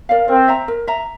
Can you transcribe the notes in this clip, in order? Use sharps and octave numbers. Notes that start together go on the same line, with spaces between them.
A#4 D5 F5
C4 A#4
E5 A#5
A#4
E5 A#5